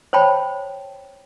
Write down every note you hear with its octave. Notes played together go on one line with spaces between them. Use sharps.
C5 C#5 G5 A5 B5